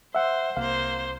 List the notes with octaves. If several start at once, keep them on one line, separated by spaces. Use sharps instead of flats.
C5 E5 F#5
C2 A#3 C5 F5